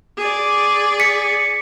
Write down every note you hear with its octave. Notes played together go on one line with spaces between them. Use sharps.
G#4 D5
B6 C#7